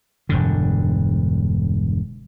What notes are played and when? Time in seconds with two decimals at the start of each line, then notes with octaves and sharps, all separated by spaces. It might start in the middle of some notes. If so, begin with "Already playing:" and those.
0.29 E1 G2 D3